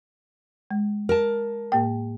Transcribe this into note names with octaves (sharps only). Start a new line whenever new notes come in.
G#3
A#4 A5
A2 A#3 G5